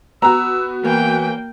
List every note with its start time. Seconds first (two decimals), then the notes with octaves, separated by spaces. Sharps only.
0.22 B3 F#4 A#5 E6
0.85 E3 A#3 C#5 G5